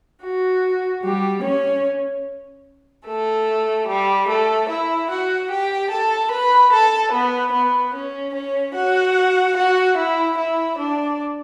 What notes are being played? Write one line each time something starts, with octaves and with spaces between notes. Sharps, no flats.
F#4
G3 G4
C#4 C#5
A3 A4
G3 G4
A3 A4
E4 E5
F#4 F#5
G4 G5
A4 A5
B4 B5
A4 A5
B3 B4
B3 B4
C#4 C#5
C#4 C#5
F#4 F#5
F#4 F#5
E4 E5
E4 E5
D4 D5